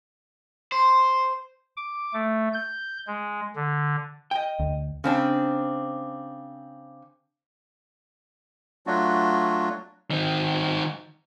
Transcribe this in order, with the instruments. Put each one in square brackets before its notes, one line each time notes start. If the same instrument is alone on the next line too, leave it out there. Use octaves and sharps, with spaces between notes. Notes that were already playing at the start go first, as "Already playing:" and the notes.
[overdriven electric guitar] C5
[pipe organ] D6
A3
G6
G#3
D3
[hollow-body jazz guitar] D#5 G5
[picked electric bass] D2
[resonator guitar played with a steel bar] C#3 C4 D4
[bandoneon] F#3 A3 D4 F4 F#4
[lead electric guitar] D#3 C4